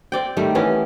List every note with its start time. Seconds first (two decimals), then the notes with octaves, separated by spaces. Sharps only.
0.12 C4 D5 G5
0.37 D#3 G3 A3
0.55 E3 B3 C#4